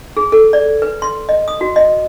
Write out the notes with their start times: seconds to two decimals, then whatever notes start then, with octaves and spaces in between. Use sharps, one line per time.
0.17 G#4
0.32 A4
0.53 D5
0.82 B4
1.02 C6
1.29 D#5
1.48 D#6
1.61 F#4
1.76 D#5